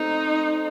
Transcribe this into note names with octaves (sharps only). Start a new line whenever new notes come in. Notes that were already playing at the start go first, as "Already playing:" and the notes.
Already playing: A3 C4 D#4